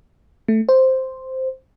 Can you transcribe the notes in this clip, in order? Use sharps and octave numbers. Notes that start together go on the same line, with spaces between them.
A3
C5